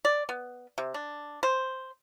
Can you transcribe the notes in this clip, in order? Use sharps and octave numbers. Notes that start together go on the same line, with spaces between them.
D5
B3
C3
D4
C5